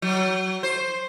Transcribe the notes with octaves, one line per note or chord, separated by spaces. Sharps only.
F#3
C5